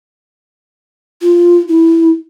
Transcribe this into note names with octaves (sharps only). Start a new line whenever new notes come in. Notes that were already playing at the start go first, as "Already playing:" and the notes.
F4
E4